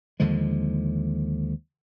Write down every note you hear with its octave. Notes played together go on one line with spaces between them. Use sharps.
D#2 D3 F3 G#3